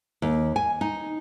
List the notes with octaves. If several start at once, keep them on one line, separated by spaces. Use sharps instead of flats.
D#2
G#5
D#4